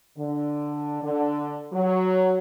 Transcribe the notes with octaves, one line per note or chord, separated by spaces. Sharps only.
D3
D3
F#3